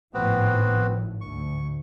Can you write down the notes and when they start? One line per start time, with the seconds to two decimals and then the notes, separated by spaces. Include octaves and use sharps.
0.14 G#1 A2 F3 B3 C4 F#4
1.21 D2 C#6